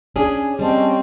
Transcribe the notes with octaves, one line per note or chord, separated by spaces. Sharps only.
C#4 D4 G#4
G3 C4 C#4 D#5 A5